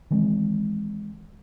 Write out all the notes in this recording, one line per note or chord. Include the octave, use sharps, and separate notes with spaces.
D#3 E3 G#3 C4